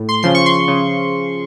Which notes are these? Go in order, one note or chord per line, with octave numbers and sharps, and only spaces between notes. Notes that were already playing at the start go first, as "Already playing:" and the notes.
Already playing: A2
C6
C#3 F3 C6
C#6
C6
C#3